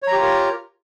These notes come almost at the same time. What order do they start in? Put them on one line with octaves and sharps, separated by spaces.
C#5 A#5 G4 F4 A#4